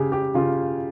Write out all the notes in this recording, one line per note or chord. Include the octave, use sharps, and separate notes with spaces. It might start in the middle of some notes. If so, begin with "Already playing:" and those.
Already playing: C#3 G4 G#4
G4
C#3 F4